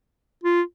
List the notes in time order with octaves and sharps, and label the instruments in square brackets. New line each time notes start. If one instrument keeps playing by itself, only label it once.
[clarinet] F4